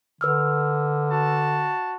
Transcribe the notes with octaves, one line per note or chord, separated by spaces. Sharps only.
D3 B4 E6 F6
F#4 A5